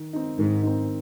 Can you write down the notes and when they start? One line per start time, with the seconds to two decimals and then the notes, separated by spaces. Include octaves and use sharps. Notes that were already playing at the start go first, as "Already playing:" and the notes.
Already playing: D#3
0.13 C4 D#4
0.38 G#2 D#3
0.63 C4 D#4